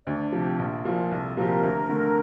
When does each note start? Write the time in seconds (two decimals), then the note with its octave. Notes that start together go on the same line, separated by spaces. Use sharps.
0.06 D2 D4 D5
0.32 C3 F3 G4
0.59 A#1 F4
0.85 A#2 F3
1.11 C2 A4
1.37 A#2 F3 C4 G4 A#4
1.63 D2
1.89 D3 A3